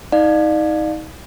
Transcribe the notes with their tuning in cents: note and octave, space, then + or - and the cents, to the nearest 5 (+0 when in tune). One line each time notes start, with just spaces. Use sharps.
D#4 +25 D5 +35 F5 +20